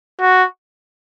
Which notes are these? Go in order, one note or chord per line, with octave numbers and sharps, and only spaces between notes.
F#4